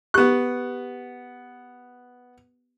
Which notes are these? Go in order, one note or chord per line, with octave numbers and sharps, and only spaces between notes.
B3 G4 C#6 F#6